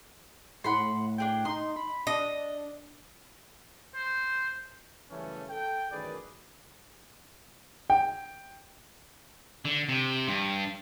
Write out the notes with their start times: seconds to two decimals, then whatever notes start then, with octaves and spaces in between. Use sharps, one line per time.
0.64 A2 F#5 B5 C6
1.18 D4 G#4 G5
1.45 D#4 C6
1.76 B5
2.07 D4 D#5
3.95 C5
5.10 F#2 C#3 E3 G3 A3 C#4
5.49 A4 G5
5.91 A1 F#2 D#3 G#4 B4 D5
7.90 G5
9.65 D3
9.89 C3
10.28 G2